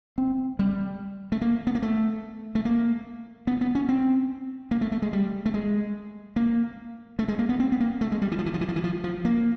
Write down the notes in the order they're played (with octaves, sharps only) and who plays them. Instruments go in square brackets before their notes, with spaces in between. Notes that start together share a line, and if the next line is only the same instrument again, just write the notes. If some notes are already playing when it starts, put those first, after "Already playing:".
[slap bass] C4
G3
A3
A#3
B3
A#3
A3
A3
A#3
B3
B3
C#4
C4
A#3
A3
A3
G#3
G3
A3
G#3
A#3
A3
G#3
A#3
B3
C4
B3
A#3
A3
G#3
G3
E3
F3
E3
F3
E3
F3
E3
F3
F3
A#3